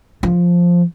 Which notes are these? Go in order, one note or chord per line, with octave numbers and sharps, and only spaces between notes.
F3